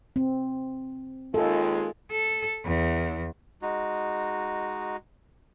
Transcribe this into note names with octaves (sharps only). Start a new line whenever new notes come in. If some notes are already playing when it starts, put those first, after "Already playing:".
C4
D#2 G#3 F4 A4
A4
E2
G#3 D#4 F#4